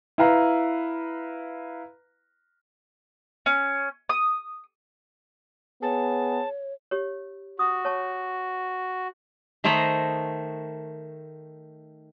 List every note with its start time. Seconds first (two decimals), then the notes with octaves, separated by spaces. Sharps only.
0.18 E4 B4 F5 A#5
3.46 C#4
4.09 D#6
5.82 B3 G#4 C#5 A5
6.91 G4 C#5
7.59 F#4 D#6
7.85 C#5 A5 C#6
9.64 D#3 A3 C5 D#5 A#5 B5